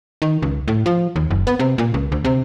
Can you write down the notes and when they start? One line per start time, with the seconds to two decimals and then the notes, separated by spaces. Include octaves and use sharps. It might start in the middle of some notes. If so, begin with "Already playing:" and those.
0.22 D#3
0.42 C#2
0.68 A2
0.86 F3
1.16 D#2
1.31 F#1
1.47 B3
1.59 C3
1.78 A#2
1.94 C#2
2.12 D2
2.25 C3